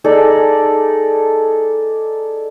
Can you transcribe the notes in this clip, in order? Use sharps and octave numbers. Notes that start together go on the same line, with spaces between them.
D#4 G#4 A4 D5